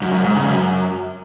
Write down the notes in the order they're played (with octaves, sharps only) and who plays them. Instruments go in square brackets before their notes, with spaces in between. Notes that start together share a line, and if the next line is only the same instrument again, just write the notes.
[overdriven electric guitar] F#2
F#2
G#2
C#3
F#2